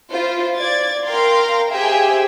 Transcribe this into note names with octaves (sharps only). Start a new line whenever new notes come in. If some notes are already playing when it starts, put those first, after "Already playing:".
E4 F4 C5
D5 G#6 A6
A#4 F5 G5 A#5 C6
G4 G#4 C5 E5 G5 G#5